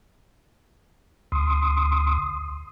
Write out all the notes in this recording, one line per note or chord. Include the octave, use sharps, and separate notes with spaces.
D2 C6 D#6